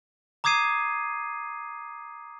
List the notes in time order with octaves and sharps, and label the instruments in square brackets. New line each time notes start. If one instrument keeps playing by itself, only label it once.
[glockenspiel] A#5 D6 D#6 G#6 C7 D#7